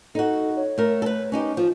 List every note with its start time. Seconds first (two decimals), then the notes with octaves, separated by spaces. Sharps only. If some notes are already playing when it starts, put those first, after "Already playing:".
0.15 D#4 F#4 A4
0.56 C#5
0.78 A3 A#4
1.02 A4 B4
1.32 C#4 D#4 G4
1.57 F3 F4